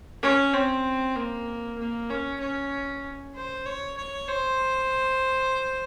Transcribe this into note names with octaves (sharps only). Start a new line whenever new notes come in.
C#4
C4
A#3
A#3
C#4
C#4
C5
C#5
C#5
C5